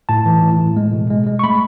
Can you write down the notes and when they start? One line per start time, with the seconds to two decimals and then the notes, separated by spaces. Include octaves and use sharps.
0.09 A2 A5
0.26 E3
0.42 A2
0.59 A2
0.77 G#3
0.93 B2
1.10 G#3
1.27 G#3
1.39 C#6
1.43 A3 B5